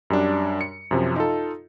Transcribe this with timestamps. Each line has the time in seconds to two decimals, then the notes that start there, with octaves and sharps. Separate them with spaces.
0.10 F#2 G3 D4
0.61 C#7
0.91 F#2 C3 F3
1.16 D#4 F4 A4